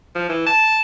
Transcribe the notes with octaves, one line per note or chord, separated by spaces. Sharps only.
F3
E3
A5